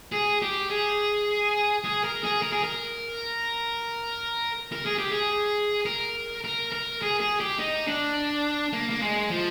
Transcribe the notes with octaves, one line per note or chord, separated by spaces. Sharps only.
G#4
G4
G#4
G#4
A#4
G#4
A#4
G#4
A#4
A#4
G#4
G4
G#4
A#4
A#4
A#4
G#4
G#4
G4
D#4
D4
A#3
A#3
G#3
F3